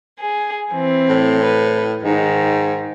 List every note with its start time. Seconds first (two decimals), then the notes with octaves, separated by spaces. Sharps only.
0.20 G#4
0.72 E3 C4
1.09 A2
1.43 B4
2.03 G#2 D#3